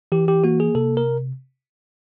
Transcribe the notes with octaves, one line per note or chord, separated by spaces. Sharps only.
E3 G4
G4
A#3 F#4
G#4
C3 A4
A#4